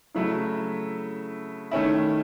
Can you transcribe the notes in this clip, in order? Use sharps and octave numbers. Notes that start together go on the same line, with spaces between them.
C#3 F#3 A3 E4
D#3 A3 C#4 E4